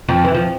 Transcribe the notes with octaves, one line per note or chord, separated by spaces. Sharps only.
F2 F3
E3
F3